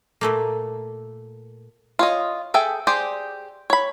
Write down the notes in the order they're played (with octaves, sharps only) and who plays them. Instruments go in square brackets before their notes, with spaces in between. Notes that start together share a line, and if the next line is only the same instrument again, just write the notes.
[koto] A#2 A3 A#3
[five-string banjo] F4 C#5 D#5
G#4 A4 E5 G5
G4 G#4 C5 D5
C#5 B5